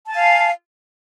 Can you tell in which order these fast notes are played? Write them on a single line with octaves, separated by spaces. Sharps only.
A5 G#5 F5